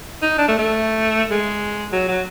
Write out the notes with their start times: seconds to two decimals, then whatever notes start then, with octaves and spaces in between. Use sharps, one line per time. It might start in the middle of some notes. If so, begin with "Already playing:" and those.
0.22 D#4
0.38 D4
0.48 A3
0.59 A3
1.31 G#3
1.93 F#3
2.08 F#3